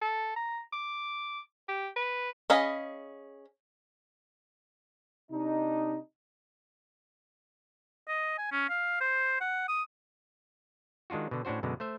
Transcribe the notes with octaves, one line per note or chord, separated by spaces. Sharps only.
A4
A#5
D6
G4
B4
C#4 G#4 D#5 F5 B5
C3 D4 D#4
D#5
G#5
C#4
F5
C5
F#5
D#6
D#3 G#3 D4 F4 F#4
B2 D3
A2 C#4 D4 F#4 C5
F#2 B2 D3 G#3
A3 C5 E5